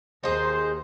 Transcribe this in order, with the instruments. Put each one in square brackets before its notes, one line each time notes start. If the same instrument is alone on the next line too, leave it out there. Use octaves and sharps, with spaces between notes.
[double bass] D#2 [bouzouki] D#4 G#4 [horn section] C5